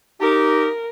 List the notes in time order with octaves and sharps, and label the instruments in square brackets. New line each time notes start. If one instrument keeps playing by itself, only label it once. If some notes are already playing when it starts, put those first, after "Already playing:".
[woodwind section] D#4 G4 [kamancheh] A#4